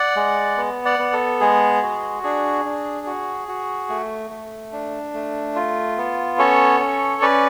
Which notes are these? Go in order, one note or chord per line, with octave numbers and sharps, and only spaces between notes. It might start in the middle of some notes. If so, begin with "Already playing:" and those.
Already playing: D5 F#5
G#3
B3
D5 F#5
B3
A4
G#3 G#4
F#4
D4 G#4
D4
F#4
F#4
A3
A3
D4
A3
F4
B3
C#4 A4 C#5
C#4
C#4 B4 D5